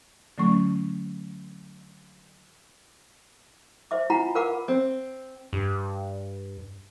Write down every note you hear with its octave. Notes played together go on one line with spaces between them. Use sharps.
D3 F#3 A3 C#4 C#6
C5 E5 D6
E4 F4 F#5 G#5 A#5 B5
A#4 B4 F5 F#5 B5 D6
C4
G2